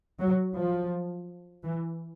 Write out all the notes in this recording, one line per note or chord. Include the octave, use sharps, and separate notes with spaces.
F#3
F3
E3